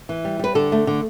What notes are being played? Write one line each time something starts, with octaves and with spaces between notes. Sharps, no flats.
E3
G3
G3 B4
D3 A4
A3
D3